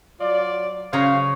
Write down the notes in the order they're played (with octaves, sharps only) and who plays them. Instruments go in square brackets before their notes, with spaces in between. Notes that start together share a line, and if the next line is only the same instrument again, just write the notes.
[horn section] F#3 F4 D5
[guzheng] C#3 C#5 A#5 [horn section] F#3 C5 F5